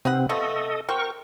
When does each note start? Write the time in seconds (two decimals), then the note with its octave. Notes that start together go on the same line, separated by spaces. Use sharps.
0.05 C3 C4 D#4 B4 F#5
0.29 F3 A3 B3 A4 D#5
0.89 C4 F#4 A#4 G5 C#6